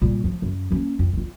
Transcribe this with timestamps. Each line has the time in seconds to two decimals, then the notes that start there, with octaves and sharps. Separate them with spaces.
0.02 A#2 G3
0.24 F3 A3
0.42 F#2
0.71 A#3 C#4
0.99 F2
1.13 C4 F4